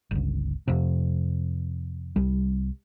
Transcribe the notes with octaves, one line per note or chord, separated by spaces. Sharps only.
G1 C#2
F2 C3
C2 G3